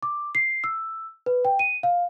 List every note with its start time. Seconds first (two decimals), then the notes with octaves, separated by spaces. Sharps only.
0.03 D6
0.35 C7
0.64 E6
1.26 B4
1.45 G5
1.59 D#7
1.83 F5